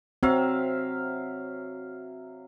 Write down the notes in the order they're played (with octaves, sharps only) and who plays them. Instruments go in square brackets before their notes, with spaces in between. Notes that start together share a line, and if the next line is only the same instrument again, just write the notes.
[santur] F#3 E5 F5 [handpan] C4